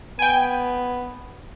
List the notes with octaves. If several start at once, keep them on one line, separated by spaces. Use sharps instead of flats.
B3 G5 G#5